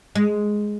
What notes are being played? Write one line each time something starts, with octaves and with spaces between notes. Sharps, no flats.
G#3